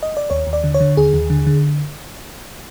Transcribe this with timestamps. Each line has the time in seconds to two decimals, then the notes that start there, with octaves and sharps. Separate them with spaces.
0.03 D#5
0.17 D5
0.30 D#2 C#5
0.47 D#2
0.53 D5
0.64 D3
0.74 C#5
0.80 D3
0.97 D#2 G#4
1.13 D#2
1.30 D3
1.47 D3